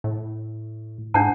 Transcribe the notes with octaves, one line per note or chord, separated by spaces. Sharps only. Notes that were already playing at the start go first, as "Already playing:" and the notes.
A2
G#2 D4 F#5 A5